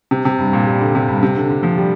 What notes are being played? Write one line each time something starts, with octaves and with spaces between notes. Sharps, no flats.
C3
C3
G2
A#2
G3
D3
C3
G2
C3
D3
D3
F3
G3